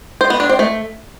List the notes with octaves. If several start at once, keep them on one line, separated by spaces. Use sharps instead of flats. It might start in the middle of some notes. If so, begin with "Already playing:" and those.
C5
B3
D4
C4
A3